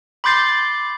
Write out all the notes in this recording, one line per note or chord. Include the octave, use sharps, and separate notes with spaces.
B5 C6 D6 G6 A6 C7